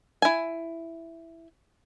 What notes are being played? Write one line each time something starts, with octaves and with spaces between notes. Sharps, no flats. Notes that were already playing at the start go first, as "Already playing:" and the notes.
E4 G#5